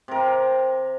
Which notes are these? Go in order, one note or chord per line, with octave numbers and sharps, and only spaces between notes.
C3 A#4